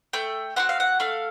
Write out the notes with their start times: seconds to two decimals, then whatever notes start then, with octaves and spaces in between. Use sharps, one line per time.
0.13 A3 G5
0.56 C4 D#4 F#4 F#5
0.69 F5
0.80 F#5
1.00 A3 F5